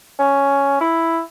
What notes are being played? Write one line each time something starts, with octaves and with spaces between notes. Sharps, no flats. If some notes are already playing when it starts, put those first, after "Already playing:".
C#4
E4